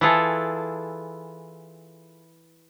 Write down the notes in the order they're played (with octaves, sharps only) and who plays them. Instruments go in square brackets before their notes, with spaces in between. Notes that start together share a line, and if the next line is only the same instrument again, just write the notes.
[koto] E3 E4 F4 G#4 A4